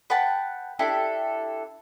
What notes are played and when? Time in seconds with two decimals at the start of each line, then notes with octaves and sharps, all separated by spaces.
0.10 B4 F#5 G5 A5
0.79 D4 E4 G4 A4